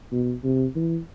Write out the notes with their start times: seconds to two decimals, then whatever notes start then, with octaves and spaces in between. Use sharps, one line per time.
0.12 B2
0.44 C3
0.75 E3